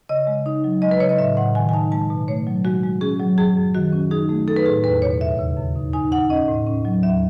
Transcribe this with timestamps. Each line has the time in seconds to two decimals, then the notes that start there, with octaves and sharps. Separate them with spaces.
0.09 C#3 D#5
0.27 G#3
0.46 D#4
0.64 F#3
0.82 G#3 D#5
0.91 B4
1.00 C#3 C#5
1.09 D#5
1.19 A2 E5
1.37 A2 F#5
1.55 D#3 G#5
1.69 G#5
1.73 D#4 A5
1.92 G#3 A5
2.10 B2
2.28 A3 C#5
2.47 F#3
2.65 G#3 F#4
2.83 G#3
3.01 C#4 G#4
3.20 F#3
3.38 F#2 G#4
3.56 F#2
3.75 D#3 F#4
3.93 C#4
4.11 D#4 G#4
4.29 A3
4.47 D#4 A4
4.56 B4
4.66 A2 G#4
4.84 E2 B4
5.02 B2 C#5
5.21 D#2 E5
5.39 C#3
5.57 F#2
5.76 D#4
5.93 D#4 G#5
6.12 D#4 F#5
6.30 C#4 D#5
6.48 A2
6.66 C#4
6.85 F#3
7.03 D#2 E5